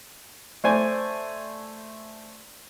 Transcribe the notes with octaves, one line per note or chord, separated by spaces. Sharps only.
A3 C5 D5 G#5